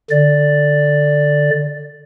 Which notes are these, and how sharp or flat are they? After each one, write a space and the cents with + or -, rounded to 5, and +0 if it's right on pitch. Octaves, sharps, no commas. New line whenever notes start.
D3 +5 D5 +0